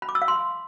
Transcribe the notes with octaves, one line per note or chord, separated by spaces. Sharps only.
B5
D6
E6
F5
C6